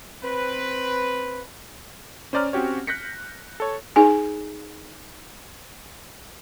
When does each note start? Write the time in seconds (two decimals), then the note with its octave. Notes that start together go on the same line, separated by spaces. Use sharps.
0.24 C4 B4
2.33 C#4 C5 D5 A#5 F6
2.53 C4 C#4 F#4 G4 C#5
2.87 F#6 G6 A#6 B6 C#7
3.60 A4 C#5
3.96 D#4 G#4 G#5